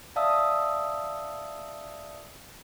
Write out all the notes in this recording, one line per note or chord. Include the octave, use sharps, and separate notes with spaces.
D5 E5 F5 A5 D#6 E6